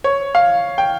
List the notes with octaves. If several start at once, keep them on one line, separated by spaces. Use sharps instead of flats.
C#5
F5
G5